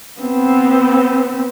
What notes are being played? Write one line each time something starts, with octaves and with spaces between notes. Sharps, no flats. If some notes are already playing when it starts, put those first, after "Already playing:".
B3 C4